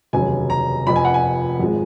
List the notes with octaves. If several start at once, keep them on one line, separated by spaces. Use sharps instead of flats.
F1 D#2 C#3 F#3 G#5
A#5
F1 F2 F3 B5
G#5
F#5
G#5
G#1 F3 G#3